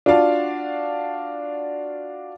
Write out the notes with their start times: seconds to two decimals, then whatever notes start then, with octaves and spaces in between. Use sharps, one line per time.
0.06 D4 F4 F#4 D5 F5 A5